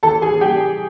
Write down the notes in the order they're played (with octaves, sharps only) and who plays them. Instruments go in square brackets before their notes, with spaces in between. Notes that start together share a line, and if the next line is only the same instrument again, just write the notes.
[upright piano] E3 A4 A5
G#4 G#5
G3 G4 G5